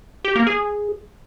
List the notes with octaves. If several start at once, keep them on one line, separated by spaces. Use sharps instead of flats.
G4
A#3
G#4